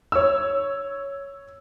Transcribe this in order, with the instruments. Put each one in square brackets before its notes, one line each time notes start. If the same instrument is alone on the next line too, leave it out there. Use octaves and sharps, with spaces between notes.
[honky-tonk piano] C#5 E6